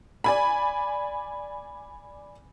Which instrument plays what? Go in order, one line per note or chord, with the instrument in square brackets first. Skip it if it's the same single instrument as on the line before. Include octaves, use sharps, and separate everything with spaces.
[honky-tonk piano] D5 G#5 B5